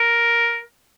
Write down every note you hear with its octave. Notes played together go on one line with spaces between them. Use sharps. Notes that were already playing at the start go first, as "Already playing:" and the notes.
Already playing: A#4